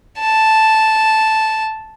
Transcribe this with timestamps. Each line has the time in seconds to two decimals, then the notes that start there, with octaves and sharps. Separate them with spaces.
0.20 A5